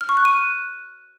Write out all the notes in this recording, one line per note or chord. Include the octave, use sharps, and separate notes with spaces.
F6
C#6
F#6
D#7
F#6